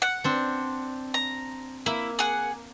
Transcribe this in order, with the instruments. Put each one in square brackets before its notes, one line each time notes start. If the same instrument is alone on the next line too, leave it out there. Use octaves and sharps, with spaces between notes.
[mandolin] F#5
[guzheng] C4 D4
[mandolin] A#5
[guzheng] A#3 [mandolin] E4
[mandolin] G#4 F#5